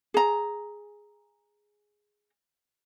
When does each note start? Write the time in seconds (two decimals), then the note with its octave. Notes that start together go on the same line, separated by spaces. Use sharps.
0.14 G#4 A#5